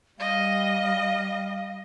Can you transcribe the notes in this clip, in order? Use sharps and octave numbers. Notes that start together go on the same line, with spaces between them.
G3 D#5 F5